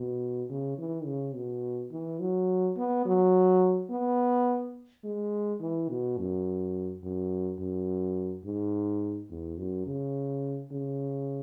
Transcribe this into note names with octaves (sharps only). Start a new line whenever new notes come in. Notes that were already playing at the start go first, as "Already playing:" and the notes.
Already playing: B2
C#3
E3
C#3
B2
E3
F#3
B3
F#3
B3
G#3
E3
B2
F#2
F#2
F#2
G#2
E2
F#2
C#3
C#3